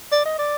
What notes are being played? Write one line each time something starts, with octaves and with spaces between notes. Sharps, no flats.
D5
D#5
D5